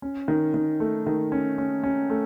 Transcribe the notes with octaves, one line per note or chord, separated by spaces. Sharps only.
C#4
D#3
D#3
A3
D#3
C#4
C#4
C#4
A3